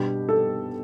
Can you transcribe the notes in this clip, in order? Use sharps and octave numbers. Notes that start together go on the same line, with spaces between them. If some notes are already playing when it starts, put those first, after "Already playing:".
Already playing: B2 G3 B3 D4 G4
A4